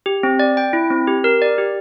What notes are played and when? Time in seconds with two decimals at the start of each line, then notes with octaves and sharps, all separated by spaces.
0.06 G4
0.23 C4
0.39 D5
0.57 G5
0.73 E4
0.90 C4
1.08 G4
1.24 A#4
1.42 D5
1.58 G4